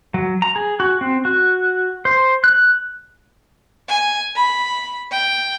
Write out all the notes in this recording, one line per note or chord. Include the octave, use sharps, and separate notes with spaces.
F#3
A#5
G#4
F#4
C4
F#4
C5
F#6
G#5
B5
G5